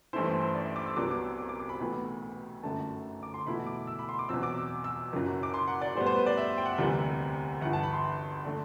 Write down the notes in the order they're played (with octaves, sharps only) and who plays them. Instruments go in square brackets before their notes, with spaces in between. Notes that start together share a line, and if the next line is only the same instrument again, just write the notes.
[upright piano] A1 G2 E3 A3 E4 C5
C5
C5
D5
E5
D6
E6
C2 C3 F#3 B3 D4 D6
D6
E6
D6
D6
D6
B5
B1 A2 E3 B3 B5
G1 F#2 D3 A3 A5
D6
C6
E2 B2 A3 E4 B5
D6
E6
B5
C6
D6
E2 B2 F#3 C4 E6
D6
E6
E6
F#1 F#2 F#3
D6
C6
F#5
D5
A2 G3 B3 C5
C5
B4
D5
E5
G5
F#5
E5
E1 D2 C3 E3 G3 F#5
G1 G2 E3 F#5
A5
B5
C6
D3 A3 D4